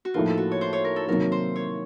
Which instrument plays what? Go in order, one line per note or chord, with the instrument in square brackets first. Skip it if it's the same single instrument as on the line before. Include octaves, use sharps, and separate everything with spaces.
[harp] F#4
[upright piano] A2 F3 A#3 D#4 [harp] F4
[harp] A4
F#4
C#5
C5
C#5
A#4
A4
[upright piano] C3 D#3 F#3 A#3 D#4 [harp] A#4
[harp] C5
C#5